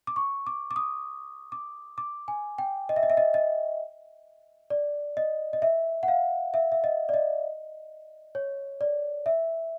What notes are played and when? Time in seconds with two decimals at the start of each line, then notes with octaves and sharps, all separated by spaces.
0.07 D6
0.16 C#6
0.47 D6
0.71 D6
0.76 D#6
1.52 D6
1.98 D6
2.28 G#5
2.58 G5
2.89 D#5
2.96 E5
3.03 D#5
3.10 E5
3.17 D#5
3.34 D#5
4.70 D5
5.17 D#5
5.53 D#5
5.62 E5
6.03 F#5
6.08 F5
6.54 E5
6.72 E5
6.84 D#5
7.09 D5
7.14 D#5
8.35 C#5
8.81 D5
9.26 E5